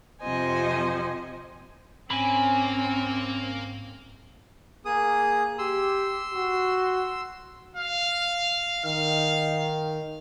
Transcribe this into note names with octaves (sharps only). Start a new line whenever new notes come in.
F2 C3 F3 C5 D#5 G#5
G#2 A#3 C4 C#4 G#5 B5
A#3 G#4 D#6
G4 C6 E6
F#4
F5
D#3 F5